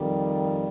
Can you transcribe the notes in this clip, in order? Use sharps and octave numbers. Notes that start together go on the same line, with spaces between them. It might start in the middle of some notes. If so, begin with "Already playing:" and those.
Already playing: F2 D#3 G3